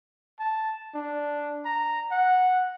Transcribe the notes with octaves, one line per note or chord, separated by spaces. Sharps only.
A5
D4
A#5
F#5